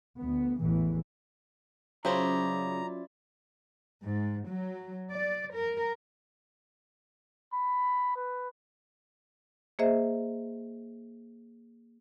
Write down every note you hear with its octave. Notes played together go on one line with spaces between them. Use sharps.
D2 B3
A1 E2 E3
C#3 F#3 C#4 E4 F4 C5 D5 A#5
G#2
F#3
D5
A#4
B5
B4
A#3 G#4 C5 D#5 E5